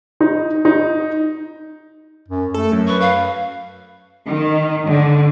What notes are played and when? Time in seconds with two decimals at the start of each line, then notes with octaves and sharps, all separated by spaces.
0.20 D#4
0.65 D#4
2.28 F#2
2.54 A3 A4
2.72 F#2
2.87 B4 C#6
3.00 F5
4.26 D#3
4.86 D3